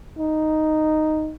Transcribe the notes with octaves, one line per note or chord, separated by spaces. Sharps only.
D#4